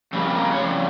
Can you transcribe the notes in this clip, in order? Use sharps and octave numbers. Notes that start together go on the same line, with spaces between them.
F2 C#3 G3 A#3 C4
G4
A#4
C#5
F2 C#3 G3 C5